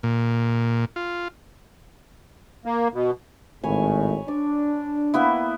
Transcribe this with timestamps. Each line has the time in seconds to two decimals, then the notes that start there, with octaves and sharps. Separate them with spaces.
0.03 A#2
0.96 F4
2.66 A#3
2.93 B2
3.63 G#1 A2 C#5 G#5 B5
4.28 D4 D5
5.14 A#3 B3 E4